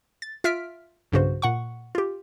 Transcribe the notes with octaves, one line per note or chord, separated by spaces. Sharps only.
A6
F4 E5 F6 B6 D7
B1 G2 C#3 F#4 C5
A#2 F#5 C#6
F4 G4